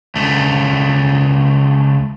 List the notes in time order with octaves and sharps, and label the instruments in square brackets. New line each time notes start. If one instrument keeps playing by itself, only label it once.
[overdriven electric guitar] C#2 A3